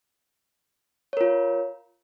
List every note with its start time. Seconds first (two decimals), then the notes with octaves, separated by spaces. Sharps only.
1.13 C#5
1.17 A#4
1.21 F4